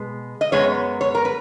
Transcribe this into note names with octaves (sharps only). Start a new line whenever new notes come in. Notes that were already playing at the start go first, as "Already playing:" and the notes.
Already playing: B2 G#3 B3
D#5
F#2 D#3 G#3 B3 C#5
C#5
A#4
B4